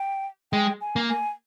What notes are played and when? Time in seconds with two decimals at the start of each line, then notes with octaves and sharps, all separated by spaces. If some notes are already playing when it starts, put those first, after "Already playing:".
Already playing: G5
0.52 G#3 G5
0.81 G#5
0.96 A#3
1.09 G#5